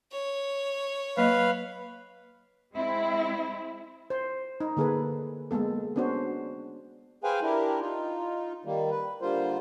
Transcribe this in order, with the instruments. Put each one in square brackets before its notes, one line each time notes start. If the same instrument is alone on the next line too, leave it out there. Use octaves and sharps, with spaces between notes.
[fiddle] C#5
[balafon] F#3 A#3 D#5 [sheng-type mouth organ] B4 F5
[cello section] G#3 C4 E4
[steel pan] C5
D#4
D3 A#3 G#4 A4 B4
G#3 A#3 B3 A4
B3 C#4 D4 F#4 C5
[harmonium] G#4 B4 C5 F5 G5 G#5
D4 E4 G4 A#4
D#4 F4
D#3 G3 A#3
B4
D3 G3 A#3 F4 C5